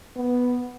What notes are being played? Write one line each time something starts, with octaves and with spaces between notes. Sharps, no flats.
B3